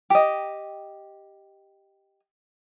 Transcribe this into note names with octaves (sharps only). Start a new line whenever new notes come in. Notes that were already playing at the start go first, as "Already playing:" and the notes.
G4 D#5